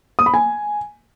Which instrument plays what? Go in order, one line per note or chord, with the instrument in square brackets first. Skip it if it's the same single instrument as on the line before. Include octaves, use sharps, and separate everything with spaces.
[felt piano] D#6
B5
G#5